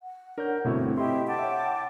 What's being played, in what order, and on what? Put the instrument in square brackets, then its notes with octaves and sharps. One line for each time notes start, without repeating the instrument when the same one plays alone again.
[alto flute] F#5
[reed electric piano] D4 C#5 G6 [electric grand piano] A#4
[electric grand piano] G1 A3 F#4 [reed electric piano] B2 E4 C#5 [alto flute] C4
[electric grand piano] E4 D#5 [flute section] G4 E5 [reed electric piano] C6
[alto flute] F#5 [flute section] G5 A5 D6
[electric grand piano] C#5 E5